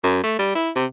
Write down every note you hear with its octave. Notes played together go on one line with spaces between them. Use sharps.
F#2
A3
G3
E4
C3